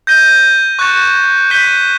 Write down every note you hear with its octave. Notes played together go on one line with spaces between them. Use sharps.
G6 A#6 D#7 G7
C#6 F#6 A6 C#7 E7
G6 B6 D#7 G7